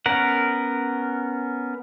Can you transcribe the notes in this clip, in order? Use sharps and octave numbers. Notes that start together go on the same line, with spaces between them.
B3 C#4 A#4 F#5